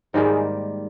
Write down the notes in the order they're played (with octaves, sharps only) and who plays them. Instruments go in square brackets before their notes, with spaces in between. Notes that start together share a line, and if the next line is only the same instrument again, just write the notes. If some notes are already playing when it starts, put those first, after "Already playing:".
[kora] G#2 D#3 G3 A#3 [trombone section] G#4